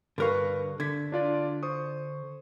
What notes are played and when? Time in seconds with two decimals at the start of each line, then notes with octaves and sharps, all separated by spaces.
0.18 G2 D3 A#4 B4 F5 C#6
0.80 D3 G#6 B6
1.12 D4 F4 D5
1.63 C5 C#6 D#6